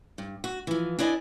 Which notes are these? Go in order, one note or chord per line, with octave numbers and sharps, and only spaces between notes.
G2
F#4
E3 F3
D4 E4 D5 D#5 G#5